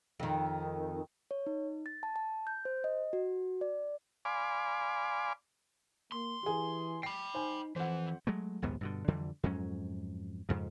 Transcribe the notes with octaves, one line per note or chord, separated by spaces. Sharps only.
F2 D#3
C#5
D#4
A6
A5
A5
G6
C5
D#5
F#4
D5
D5 F5 G#5 B5 C6 D6
A#3 C6
E3 G4 G#4
G5 B5 C7
D#4 C5 G#5
F2 E3 C5 F#5
F#3 G#3 A3
A#1 D#2 G#2 B3
G2 B2 D3
F2 D3 E3 G3
F2 G#2 F#3 C#4
F2 G#2 C#3